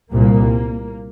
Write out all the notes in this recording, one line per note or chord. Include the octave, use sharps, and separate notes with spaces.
C2 A#2 A#3